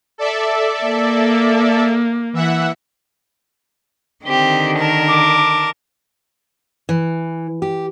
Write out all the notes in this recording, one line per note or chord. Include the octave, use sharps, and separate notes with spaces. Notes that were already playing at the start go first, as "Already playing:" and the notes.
A4 D5 E5
A#3
E3 E5 F#5
D3 D#3 C4 G4
A#4 A5
D6
E3
G4